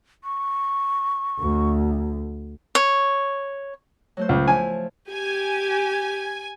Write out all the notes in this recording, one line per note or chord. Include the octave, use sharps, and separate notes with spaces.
C#6
D2
C#5
F#3 A3 C5
C#2
F3 E4 G#5
G4 G#5